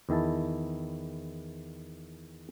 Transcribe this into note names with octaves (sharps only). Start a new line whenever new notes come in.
E2 D#3 E4 A5